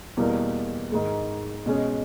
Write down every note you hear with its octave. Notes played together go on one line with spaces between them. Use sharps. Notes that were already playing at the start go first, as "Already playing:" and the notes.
E2 B2 G3 A#3
G#2 D#3 G#3
B2 G#3 C#4